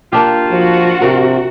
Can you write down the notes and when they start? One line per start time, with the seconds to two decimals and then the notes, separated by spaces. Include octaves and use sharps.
0.13 A#3 D4 F4 G4
0.51 F3 F#4
1.02 C3 A#4